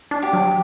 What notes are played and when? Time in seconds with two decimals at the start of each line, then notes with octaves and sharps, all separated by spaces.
0.11 D4
0.22 G4
0.33 F#3